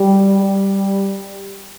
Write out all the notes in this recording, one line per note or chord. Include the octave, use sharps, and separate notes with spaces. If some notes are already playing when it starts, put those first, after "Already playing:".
Already playing: G3
G3